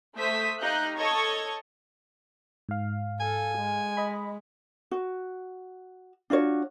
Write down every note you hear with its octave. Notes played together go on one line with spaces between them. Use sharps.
A3 C5 E5 D#6 B6
D#4 G4 F5 F#6 G6
A4 C#5 D#5 A5 C#6 G#6
G#2 F5
A4 G#5
G#3
D#5 B5
F#4
D4 F4 F#4 C#5